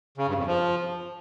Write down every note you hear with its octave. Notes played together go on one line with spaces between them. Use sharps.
C#3
G2
F2
F3